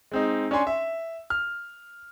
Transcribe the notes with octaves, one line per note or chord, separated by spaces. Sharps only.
G#3 C4 D#4
C#4 D4 C#5 G#5 C6
E5
F6